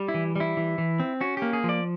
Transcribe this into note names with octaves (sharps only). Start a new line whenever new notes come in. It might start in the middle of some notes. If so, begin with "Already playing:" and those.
Already playing: G3
E4
E3
G3 E4
E3
E3
C4
C#4 F#4
A#3 G4
G#4
F3
D5